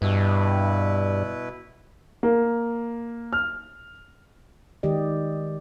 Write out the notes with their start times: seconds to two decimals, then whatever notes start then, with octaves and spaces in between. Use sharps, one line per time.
0.02 G2 B2 E4 B4
2.23 A#3
3.33 F6
4.83 D#3 G#3 G4 D5 D#5